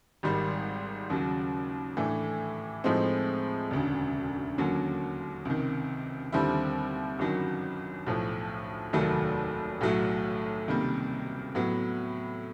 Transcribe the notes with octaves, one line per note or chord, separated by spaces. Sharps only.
G#1 G#2 D#3 G3
D#2 C#3 F#3
A2 E3 A3 D4
A2 F3 G#3 C4 D#4
E1 D2 C#3
D#2 D3 F#3 A#3 C#4
C#2 C3 D#3
D#2 D3 G3 C4 E4
G1 F#2 D#3 F#3
B1 A2 F3
F1 D#2 D#3 F#3 A3
B1 A2 F#3 A3
C#2 C3 D#3 G3 A#3
A2 F#3 B3